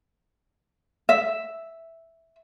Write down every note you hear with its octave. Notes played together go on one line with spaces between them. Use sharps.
E5